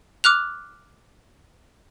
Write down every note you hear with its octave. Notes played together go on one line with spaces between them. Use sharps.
D6 F6 F#6 F7